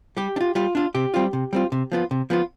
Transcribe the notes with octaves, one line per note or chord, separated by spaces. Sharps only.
G3 G4
D4
F4
G3 F4
D4 F4
C3 G4
G3 C4 F4
C3
G3 C4 F4
C3
F3 B3 F4
C3
F3 B3 F4